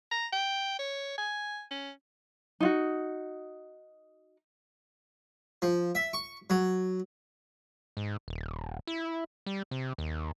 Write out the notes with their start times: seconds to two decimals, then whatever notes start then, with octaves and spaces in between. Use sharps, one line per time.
0.11 A#5
0.32 G5
0.79 C#5
1.18 G#5
1.71 C#4
2.60 D#4 F4 F#4
5.62 F3
5.95 E5
6.13 C#6
6.50 F#3
7.97 G#2
8.28 D#1
8.87 E4
9.46 G3
9.71 C3
9.98 D#2